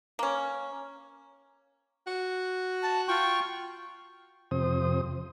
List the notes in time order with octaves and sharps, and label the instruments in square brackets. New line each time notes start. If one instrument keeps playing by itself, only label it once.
[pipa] A#3 C#4
[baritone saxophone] F#4
[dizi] A5
[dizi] F4 [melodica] G5 C#6
[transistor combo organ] F2 C3 C5 D#6